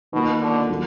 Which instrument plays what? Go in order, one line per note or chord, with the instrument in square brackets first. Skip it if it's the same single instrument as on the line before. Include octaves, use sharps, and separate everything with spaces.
[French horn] B2 [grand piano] D#3 A#3 F4
[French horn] D3
[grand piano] D#3 F#3 A#3 D#4